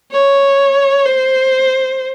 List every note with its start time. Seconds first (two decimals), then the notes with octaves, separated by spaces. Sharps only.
0.11 C#5
1.06 C5